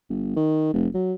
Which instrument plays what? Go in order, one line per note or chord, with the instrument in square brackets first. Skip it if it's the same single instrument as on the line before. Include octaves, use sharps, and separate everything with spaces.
[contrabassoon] G1
D#3
F1
F#3